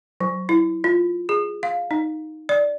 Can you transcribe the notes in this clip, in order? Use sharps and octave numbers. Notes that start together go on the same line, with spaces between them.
F#3
E4
F4
G#4
F5
D#4
D5